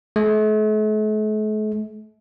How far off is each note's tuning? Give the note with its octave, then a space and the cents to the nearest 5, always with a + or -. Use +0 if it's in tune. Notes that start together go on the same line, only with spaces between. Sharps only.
A3 -45